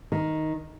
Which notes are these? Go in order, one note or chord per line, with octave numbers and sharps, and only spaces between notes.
D#3